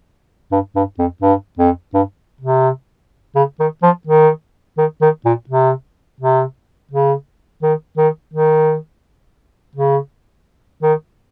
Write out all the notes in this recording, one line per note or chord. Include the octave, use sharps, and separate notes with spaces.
G2
G2
F2
G2
F2
G2
C3
C#3
D#3
F3
D#3
D#3
D#3
A#2
C3
C3
C#3
D#3
D#3
D#3
C#3
D#3